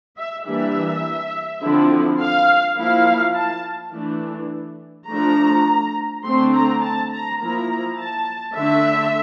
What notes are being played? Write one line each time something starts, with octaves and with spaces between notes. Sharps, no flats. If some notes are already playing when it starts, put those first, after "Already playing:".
E5
E3 G3 A#3 D4 E5
D3 F3 C4 E4
F5
F3 A#3 E4 F5
A5
E3 A3 D4
F3 A3 D4 A#5
D3 A3 C4 C6
A#5
A5
A#5
F3 A#3 E4 A#5
A5
D3 A3 D4 E5